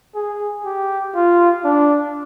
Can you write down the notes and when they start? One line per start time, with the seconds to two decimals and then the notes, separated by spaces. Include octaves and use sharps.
0.15 G#4
0.65 G4
1.15 F4
1.65 D4